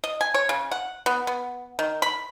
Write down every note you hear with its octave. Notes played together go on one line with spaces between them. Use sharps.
D#5
G#5
C#5
C#3
F#5
B3
B3
D#3
B5